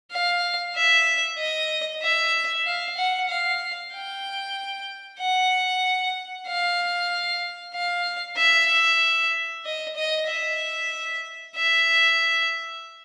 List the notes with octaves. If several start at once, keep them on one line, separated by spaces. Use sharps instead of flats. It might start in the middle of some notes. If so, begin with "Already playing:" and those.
F5
E5
D#5
E5
F5
F#5
F5
G5
F#5
F5
F5
E5
D#5
D#5
E5
E5